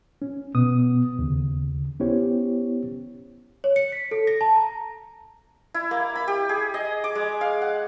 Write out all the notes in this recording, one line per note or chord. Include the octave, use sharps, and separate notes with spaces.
C#4
B2 B3 D#6
D#2 C#3
B3 C#4 E4 G4 C5 C#5
C#5
C#7
B6
A4
A#6
A5
A#5
E4
A#3
B5
G4
G#4
D#5
D6
G#3
F5
F#5